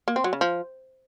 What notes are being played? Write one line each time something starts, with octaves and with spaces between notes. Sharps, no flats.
A#3
C4
F#3
C#3
F3